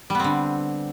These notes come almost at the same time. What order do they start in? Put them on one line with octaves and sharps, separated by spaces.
G3 B3 C4 D3